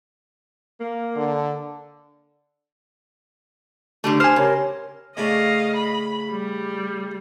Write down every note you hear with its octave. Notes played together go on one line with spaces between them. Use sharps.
A#3
D3
D3 G3 A3
C5 G#5 F6
C#3 G4 A#4 C#5
A2 C#3 D4 D#5 F5
B5
G3